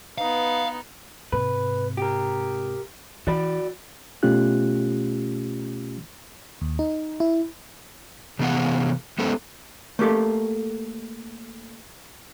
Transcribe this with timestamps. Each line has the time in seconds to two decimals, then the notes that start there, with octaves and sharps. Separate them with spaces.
0.18 B3 D#4 B4 F5
1.32 G#2 C3 B4
1.97 G4 A#4
3.27 E3 F#4 D5 B5
4.23 B2 A3 C#4 F4 G4 F#6
6.61 D#2
6.79 D#4
7.20 E4
8.39 C3 E3 B3 G#4 F5 F#5
9.18 G#3 A3 B3 C#4 A4 C5
9.99 A3 A#3 G4 A4